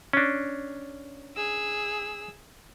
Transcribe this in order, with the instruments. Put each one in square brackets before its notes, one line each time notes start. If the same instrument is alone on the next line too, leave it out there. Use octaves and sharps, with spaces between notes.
[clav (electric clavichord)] C#4 D4
[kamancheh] G#4 E6